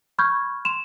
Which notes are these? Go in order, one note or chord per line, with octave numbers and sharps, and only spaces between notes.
B5 C#6 F6 G6 G#6
C6 E7 F7